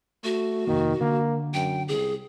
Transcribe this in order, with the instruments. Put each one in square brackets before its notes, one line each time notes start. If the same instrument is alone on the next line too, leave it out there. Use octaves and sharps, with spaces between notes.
[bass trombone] A3 [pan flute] F#4
[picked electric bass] F1 E2 A#3 [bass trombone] D#3
[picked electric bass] D3 [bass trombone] A#3
[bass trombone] F#2 [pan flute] G5
[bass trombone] C2 [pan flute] G#4